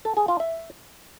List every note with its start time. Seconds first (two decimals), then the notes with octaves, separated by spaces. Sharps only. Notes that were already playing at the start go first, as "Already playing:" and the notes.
0.05 A4
0.17 G#4
0.28 F4
0.40 E5